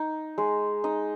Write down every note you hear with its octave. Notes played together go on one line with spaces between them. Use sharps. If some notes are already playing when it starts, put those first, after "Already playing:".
Already playing: D#4
G#3
D#4 D#5